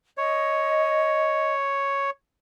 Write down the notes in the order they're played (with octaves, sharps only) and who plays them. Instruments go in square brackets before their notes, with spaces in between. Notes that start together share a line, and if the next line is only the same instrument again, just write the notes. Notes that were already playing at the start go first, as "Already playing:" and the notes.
[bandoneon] C#5 [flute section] D#5